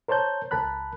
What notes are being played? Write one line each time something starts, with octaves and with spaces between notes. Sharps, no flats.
A#4 C5 C#5 A5 G6
C#2 A#4 A5 B5 F#6